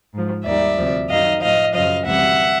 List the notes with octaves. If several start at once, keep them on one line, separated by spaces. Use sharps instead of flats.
G#2 F3
D#2 D#3 G3 D5 E5
D2 C3 F3
F#2 D#3 F#3 D#5 F5
A2 F3 D#5 F5
F#2 C#3 F3 D#5 F5
D2 C3 E3 G3 E5 F#5